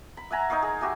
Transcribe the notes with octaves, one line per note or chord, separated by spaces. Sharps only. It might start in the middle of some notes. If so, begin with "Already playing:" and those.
B5
E5 F#5 G#5 A#5
D#4 A#4 C#5 F5
G#4
F#4 G4 E5 G#5